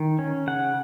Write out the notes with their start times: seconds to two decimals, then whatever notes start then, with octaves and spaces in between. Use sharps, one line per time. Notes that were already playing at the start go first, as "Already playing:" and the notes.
Already playing: D#3
0.19 C#4
0.47 C#3 F#5